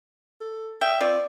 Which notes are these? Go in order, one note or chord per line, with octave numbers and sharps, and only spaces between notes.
A4
E5 G5
C4 F4 D5